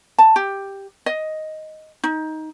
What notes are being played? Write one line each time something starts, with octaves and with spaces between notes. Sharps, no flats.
A5
G4
D#5
D#4